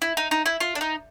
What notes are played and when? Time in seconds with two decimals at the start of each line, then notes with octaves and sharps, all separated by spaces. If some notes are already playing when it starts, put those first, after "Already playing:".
0.02 E4
0.17 D#4
0.31 D#4
0.46 E4
0.60 F4
0.75 D4
0.81 D#4